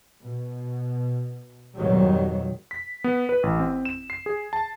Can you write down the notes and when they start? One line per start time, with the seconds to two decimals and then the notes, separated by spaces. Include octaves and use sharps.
0.22 B2
1.77 F2 G#2 B2 D#3 F#3 G3
2.71 B6
3.04 B3
3.29 B4
3.43 A1
3.60 C4
3.85 E7
4.10 C7
4.26 G#4
4.53 A5